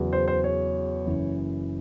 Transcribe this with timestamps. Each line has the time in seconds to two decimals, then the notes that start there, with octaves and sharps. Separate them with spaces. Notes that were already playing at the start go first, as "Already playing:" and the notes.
Already playing: E2 C#3 F#3
0.13 C5
0.28 C5
0.44 C#5
1.06 F#1 F#2 E3